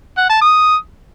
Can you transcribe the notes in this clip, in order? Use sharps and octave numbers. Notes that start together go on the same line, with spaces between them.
F#5
A5
D#6